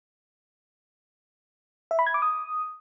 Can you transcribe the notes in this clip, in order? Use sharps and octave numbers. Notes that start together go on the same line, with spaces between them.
E5
B5
G#6
D6
D#6